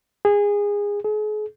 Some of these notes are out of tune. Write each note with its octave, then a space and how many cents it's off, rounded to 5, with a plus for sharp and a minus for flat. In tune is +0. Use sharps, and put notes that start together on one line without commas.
G#4 -20
G#4 +40